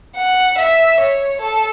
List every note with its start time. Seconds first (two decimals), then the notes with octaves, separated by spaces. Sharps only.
0.16 F#5
0.58 E5
1.00 C#5
1.41 A4